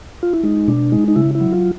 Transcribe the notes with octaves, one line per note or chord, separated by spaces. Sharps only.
F4
E4
G#3 D#4
B2 D4
G#3 D#4
D#4
C#3 E4
E4
F#3
F4